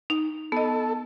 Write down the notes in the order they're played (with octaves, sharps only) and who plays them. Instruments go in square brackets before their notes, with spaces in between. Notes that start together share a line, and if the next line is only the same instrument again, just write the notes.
[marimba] D#4
[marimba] B3 D#5 [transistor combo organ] A4